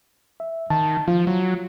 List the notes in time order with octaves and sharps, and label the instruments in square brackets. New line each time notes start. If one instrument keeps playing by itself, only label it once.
[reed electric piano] E5
[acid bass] D#3 [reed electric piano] A5
[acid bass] F3 [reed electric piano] F4
[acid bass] F#3